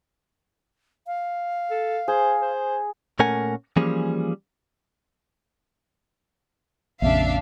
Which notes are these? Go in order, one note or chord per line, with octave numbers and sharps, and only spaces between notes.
F5
A4
G#4 C5
C5
A#2 A3 C#4 A#4 F#5 G#5
E3 F3 G3 A#3 C#4 G#4
A#1 F2 C#3 D4 E5 F5